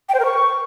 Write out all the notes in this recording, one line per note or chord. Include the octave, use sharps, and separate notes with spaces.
G5
C5
A#4
C#6